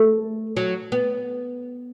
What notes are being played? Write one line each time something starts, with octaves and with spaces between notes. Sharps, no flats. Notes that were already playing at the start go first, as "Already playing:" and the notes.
Already playing: A3
F#3
B3